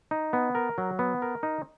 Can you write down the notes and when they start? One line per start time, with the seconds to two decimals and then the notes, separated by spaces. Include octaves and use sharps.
0.11 D#4
0.33 B3
0.55 A#4
0.78 F#3
0.99 B3
1.22 A#4
1.43 D#4